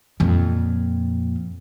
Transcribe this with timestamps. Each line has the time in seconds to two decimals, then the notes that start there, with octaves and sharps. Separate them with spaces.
0.20 F2 A#2